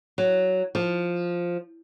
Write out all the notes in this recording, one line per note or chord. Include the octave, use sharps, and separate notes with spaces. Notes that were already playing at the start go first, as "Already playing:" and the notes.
F#3
F3